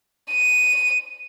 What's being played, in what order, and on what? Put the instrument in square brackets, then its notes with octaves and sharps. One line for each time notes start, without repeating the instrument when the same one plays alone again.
[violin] D#7